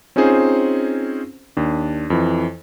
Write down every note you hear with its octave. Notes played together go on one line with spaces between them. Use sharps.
C4 C#4 D#4 F4 G#4 C5
D#2 D4
F2 E3